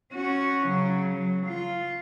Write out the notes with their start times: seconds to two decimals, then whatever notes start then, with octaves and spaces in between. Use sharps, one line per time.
0.13 C#4 F#4
0.67 C#3 F#3
1.14 F#3
1.46 F4